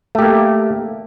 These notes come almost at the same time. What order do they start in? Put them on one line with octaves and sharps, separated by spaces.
A3 G4 A#3